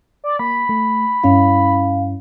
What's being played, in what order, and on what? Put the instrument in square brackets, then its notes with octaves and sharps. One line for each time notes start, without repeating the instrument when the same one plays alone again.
[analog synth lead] D5
[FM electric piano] A#3 [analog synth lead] B5
[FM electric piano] A3
[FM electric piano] G2 C#4 E4 [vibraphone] F5